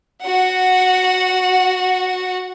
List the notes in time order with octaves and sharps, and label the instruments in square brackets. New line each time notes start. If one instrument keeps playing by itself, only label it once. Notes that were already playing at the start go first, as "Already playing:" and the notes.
[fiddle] F#4 F#5